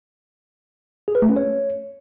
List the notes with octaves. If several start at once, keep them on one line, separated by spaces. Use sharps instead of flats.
G#4
B4
A3
C#4
C#5